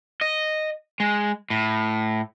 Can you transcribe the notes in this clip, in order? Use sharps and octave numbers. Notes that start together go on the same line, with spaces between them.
D#5
G#3
A2